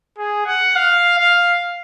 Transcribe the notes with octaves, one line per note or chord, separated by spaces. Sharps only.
G#4
F#5
F5
F5